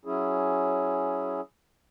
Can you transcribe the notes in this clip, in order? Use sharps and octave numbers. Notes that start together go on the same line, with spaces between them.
F#3 C#4 E4 G#4